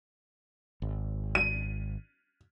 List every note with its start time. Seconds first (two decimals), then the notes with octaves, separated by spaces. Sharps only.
0.82 G#1
1.35 D#7